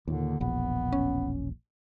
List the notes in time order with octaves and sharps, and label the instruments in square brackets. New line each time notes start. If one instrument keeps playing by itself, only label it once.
[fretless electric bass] D#2 A#2 [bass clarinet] D3
[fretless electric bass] E1 A#1 [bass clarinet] B3
[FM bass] C#4